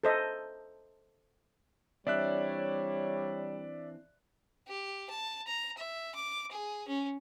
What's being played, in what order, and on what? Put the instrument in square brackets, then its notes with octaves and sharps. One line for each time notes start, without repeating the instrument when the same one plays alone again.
[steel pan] A4 C5 D#5
[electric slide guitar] E3 C4 D4 [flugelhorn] G3 [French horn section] C#5 [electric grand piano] D5 E5 F#6
[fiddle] G4
A5
A#5
E5
D6
G#4
C#4